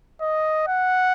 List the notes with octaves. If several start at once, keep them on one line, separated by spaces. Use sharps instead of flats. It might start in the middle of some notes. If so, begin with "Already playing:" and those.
D#5
F#5